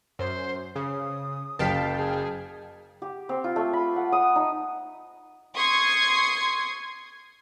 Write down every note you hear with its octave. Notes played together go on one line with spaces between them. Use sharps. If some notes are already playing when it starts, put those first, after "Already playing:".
F#2 C5
C#3 D#6
F#1 F5 G5 A5 B6
G#4
G4
C4
F4
A3
B5
F#5
D#6
D#4
C6 C#6 D#6 G#6 C7